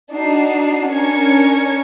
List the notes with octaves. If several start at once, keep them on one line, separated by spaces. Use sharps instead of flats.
D4 D#4 F#4 C7
C#4 D4 A#4 G#6 C#7